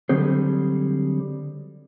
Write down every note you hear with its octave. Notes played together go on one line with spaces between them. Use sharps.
D3 F#3 G3 C4 G#4 C5